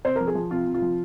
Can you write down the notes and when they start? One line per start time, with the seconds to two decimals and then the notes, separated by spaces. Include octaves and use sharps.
0.05 C3 C5
0.16 F3 A#4
0.27 G#4
0.35 F3
0.51 C3 F4
0.67 C3
0.74 F4
0.82 F3